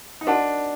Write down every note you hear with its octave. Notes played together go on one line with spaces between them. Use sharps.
D#4
D4 F#4 A#4 D#5 F#5 A5